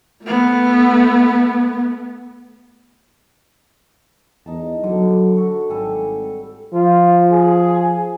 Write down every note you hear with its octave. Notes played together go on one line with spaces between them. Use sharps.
A3 B3
E2 D#4 A5
D3 F#3
F#4 A4 C#6
G#1 G3 A4 G#5
F3 F4
G#4